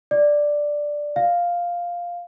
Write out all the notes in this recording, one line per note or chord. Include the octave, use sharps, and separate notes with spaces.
D5
F5